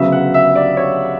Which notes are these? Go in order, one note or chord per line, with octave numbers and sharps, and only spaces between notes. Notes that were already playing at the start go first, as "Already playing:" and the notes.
Already playing: D2 C#3 F#3 B3 E5
F#5
E5
D5
C#5